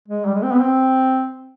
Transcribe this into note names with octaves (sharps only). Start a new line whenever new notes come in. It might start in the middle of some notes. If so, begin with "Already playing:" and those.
G#3
G3
G#3
C4
B3
C4